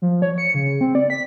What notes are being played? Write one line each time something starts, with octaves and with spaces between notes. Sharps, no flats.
F3
C#5
C#7
C#3
C4
D5
B6